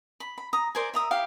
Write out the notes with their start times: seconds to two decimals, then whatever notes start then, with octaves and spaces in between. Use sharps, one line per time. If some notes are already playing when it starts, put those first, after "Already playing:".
0.20 B5
0.38 B5
0.53 A#5 D#6
0.75 A#4 C5 D5 G#5
0.94 E5 A#5 D#6
1.11 E4 G4 F5